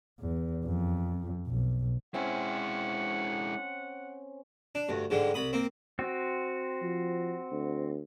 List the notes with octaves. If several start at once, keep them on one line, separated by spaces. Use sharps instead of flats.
E2
F2
B1
G#3 C4 C#4 E4 C5 F#5
D4
D2 G2
G#2 D3 G3 G#3
C2 B5 D#6
A#3 C4
C4 F#4
F3
D2